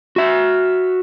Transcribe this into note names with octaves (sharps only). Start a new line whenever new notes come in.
F#4 E5